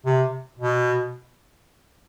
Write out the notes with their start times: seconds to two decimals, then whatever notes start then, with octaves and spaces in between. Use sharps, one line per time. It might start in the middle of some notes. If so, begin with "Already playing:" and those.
0.05 C3
0.59 B2